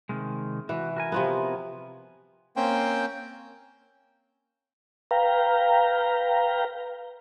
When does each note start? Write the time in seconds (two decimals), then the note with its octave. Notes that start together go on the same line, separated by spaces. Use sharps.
0.09 C3 D#3 G#3
0.69 E3 F#4
0.96 F#4 A#4 G#5
1.12 C3 F3 B3
2.56 A#3 C4 C#4 C5 G5
5.11 B4 F5 G5 A#5